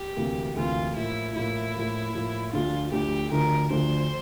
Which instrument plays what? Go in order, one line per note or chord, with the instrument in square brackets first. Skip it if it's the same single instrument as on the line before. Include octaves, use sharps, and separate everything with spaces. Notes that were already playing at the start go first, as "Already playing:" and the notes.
Already playing: [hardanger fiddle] G4
[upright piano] D2 C3 E3 A#3
[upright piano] D2 C3 E3 A#3 [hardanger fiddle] F4
[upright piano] A2 F3 A#3 [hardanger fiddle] E4
[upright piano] A2 F3 A#3 [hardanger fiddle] E4
[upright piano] A2 F3 A#3
A2 F3 A#3
[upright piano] D2 D3 F3 A3 D4 [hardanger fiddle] F4
[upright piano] D2 D3 F3 A3 D4 [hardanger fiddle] G4
[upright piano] D2 D3 F3 A3 D4 [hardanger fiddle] A#4
[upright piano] D2 D3 F3 A3 D4 [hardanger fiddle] C5